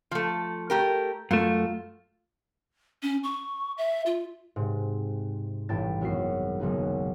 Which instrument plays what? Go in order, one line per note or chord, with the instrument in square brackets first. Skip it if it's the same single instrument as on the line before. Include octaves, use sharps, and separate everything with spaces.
[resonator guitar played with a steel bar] F3 A3
A3 G4 A#4
[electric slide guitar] F#2 A3 [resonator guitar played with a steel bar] F4
[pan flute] C#4
C#6
E5
F4
[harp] G#2 C3
A1 G2 E4 G5 A5 A6
G#1 F#2 B3 F#4 C7
F#1 B1 C#3 B3 D#4